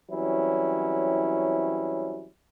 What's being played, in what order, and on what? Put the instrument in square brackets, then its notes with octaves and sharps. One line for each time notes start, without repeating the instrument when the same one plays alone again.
[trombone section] E3 F#3 G3 C4 C#4 E4